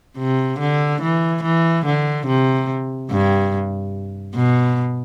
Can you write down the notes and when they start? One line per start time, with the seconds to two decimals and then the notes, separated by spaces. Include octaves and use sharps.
0.17 C3
0.59 D3
1.01 E3
1.43 E3
1.85 D3
2.27 C3
3.11 G2
4.35 B2